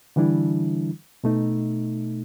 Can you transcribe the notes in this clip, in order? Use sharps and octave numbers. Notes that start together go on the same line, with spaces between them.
D3 E3 G3 D4 E4
B2 A3 D#4